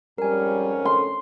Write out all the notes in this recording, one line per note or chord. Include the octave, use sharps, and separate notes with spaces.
F2 G#2 G3 C#4 A#4 G#5
A4 C6